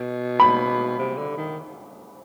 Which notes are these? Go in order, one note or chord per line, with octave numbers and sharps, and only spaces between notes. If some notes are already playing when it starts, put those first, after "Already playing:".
Already playing: B2
B5
C3
D3
D#3